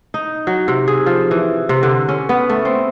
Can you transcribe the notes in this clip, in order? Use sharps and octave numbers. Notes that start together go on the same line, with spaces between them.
D#4
F#3
C3
G#4
F3
E3
C3
D3
C#4
B3
A3
C4